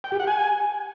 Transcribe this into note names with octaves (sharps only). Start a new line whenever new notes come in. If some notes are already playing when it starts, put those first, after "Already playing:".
G5
G4
F#5
G#5